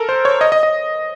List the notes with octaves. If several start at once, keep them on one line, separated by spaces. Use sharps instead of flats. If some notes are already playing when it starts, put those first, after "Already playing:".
Already playing: A4 A#4
C5
C#5
D#5
D#5
D#5